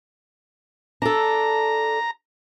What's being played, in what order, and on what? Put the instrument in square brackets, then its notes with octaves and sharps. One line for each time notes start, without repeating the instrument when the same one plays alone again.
[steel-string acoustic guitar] D4 A4 [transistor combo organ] A#5